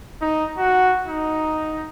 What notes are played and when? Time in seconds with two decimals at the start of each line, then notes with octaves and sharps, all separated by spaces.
0.21 D#4
0.58 F#4
1.08 D#4